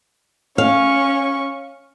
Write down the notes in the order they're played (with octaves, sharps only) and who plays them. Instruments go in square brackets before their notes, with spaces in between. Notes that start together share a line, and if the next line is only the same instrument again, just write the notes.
[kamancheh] C#4 C#6 [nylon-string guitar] F5